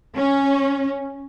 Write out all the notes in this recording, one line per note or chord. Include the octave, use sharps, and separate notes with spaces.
C#4